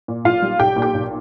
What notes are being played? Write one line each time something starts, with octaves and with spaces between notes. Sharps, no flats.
A#2
B1 F4 F5
G3
B1 G4 G5
A#2
G4 G5
B1